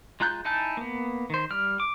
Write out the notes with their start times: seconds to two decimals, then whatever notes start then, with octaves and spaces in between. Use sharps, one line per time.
0.20 G#3 F4 A#5 F#6 G6
0.45 D#4 E4 G#5 A5 G6
0.77 A#3 B3
1.30 D#3 C5
1.51 G3 F6
1.80 D6